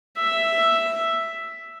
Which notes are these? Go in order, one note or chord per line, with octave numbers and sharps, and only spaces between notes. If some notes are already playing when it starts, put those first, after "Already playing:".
E5